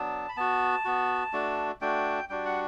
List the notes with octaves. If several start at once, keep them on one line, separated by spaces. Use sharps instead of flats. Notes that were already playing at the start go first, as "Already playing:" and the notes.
Already playing: F#3 B3 D4 A5
B5
B3 F#4 A5
B3 F#4
A3 D4 F#4
A3 D4 F#4 G5
G3 D4 F#4 G5
F#5